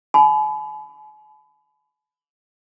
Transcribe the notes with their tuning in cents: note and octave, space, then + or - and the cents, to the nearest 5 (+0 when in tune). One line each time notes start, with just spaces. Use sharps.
G#5 +45 B5 +20